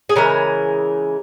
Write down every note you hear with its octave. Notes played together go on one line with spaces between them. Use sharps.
G#4
C#3 E3 G#3 A#4